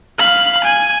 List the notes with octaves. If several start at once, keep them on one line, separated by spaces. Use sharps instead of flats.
F5 B5
G#5